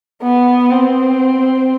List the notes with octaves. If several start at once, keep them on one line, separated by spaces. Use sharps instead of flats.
B3
C4